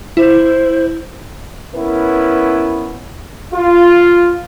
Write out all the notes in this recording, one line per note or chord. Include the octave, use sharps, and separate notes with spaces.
E4 C5
B3 C#4 E4 A#4 B4
F4